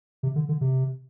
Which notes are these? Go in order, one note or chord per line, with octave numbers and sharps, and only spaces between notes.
C3
D3
D3
C3